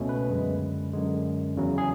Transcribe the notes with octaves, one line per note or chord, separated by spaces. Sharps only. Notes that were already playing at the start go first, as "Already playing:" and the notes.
Already playing: C#2 B2 A3 C#4
B4
F#2 D3 G#3
F#2 D3 G#3
E2 C#3 F#3
G#4